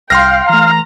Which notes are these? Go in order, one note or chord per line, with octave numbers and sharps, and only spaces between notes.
C2 F5 G5 C6 F6 A#6
E3 A3 A#5